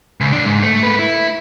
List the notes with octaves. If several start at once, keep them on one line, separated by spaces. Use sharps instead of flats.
C#2
F2 D4
G#2
A3
A#3 B4
E4